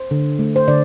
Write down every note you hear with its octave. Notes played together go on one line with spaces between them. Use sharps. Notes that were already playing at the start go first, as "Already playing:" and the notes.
Already playing: C5
D3
A3
C5
D3 D5